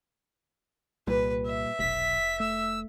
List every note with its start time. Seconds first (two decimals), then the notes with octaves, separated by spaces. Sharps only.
1.07 C2 A#2 G3 B4
1.47 E5
1.79 F1 B1 B6
2.40 A3 E6